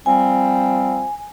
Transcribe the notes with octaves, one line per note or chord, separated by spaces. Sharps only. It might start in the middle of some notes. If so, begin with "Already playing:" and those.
F3 G3 C4 G#5